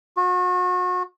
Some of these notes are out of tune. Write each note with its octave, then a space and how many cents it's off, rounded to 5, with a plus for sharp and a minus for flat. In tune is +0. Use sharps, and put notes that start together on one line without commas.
F#4 -35